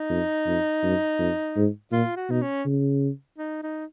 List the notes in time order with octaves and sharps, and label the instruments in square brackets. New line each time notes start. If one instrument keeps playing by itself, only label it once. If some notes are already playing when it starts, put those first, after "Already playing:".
Already playing: [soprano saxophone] D#4
[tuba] F2
F2
F#2
F2
G#2
[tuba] A#2 [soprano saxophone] F4
[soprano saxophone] F#4
[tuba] B2 [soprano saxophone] D#4
[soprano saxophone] C#4
[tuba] C#3
[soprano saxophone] D#4
D#4